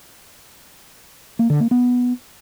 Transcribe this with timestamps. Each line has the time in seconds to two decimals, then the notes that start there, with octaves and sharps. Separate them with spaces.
1.39 A#3
1.50 D3
1.60 A#3
1.71 B3